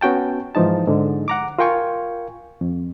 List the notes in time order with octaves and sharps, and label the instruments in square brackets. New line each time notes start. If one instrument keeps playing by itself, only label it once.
[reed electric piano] B3 C#4 F#4 G5 A5
G#2 E3 F3 D#4 A5
G#2 D3
F#5 A#5 D6
F4 A#4 F5 G5 G#5 C#6
F2